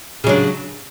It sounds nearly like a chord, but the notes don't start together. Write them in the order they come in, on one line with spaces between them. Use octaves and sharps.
C#3 F#3 D4